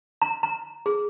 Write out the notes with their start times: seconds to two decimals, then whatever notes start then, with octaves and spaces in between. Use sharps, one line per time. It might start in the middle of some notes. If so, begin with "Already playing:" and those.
0.22 A#5
0.43 A#5
0.86 G#4